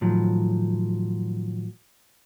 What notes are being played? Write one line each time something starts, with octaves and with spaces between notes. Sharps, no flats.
A2 D#3 F3 F#3